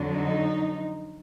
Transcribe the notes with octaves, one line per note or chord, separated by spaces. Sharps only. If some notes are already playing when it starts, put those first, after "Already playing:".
Already playing: F2 D3 F#3
D#4